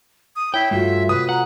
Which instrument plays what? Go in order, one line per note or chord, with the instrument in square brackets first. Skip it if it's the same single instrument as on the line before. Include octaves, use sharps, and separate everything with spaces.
[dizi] D#6
[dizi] E4 [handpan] C#5 [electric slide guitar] G5
[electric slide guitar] G2 [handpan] A3 F4 F#4 [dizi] E5
[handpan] C3 [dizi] B4 [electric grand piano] D#6
[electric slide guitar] F#5 [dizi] A#5